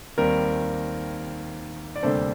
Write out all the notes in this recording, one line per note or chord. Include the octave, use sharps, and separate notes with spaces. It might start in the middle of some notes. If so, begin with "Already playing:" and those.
D#2 D#3 G3 C4 A#4
D5
D2 C3 G3 A#3 D4 A4 C5